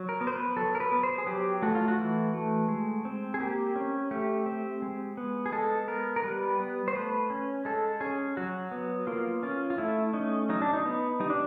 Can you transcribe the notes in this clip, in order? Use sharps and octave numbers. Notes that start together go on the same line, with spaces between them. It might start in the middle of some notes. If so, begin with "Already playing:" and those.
Already playing: F#3
A#4
B3
C5
B4
F#3 A4
A#4
B4
B3
C5
G#4
F#3 G4
A3 F#4
F4
F#4
E3
A3
G#3
C4
G#4
A#3 G4
C#4
A3 G4
C4
G#3
B3
G#4
G#3 A4
B3 A#4
A#4
G3 B4
B3
C5
A3 B4
C#4
G#3 A4
C#4 G#4
F#3 F#4
B3
A#3 F4
C#4 F4
F4
A3 E4
C#4 D#4
F#3 D#4
D4
D#4
B3
G3 D#4
D4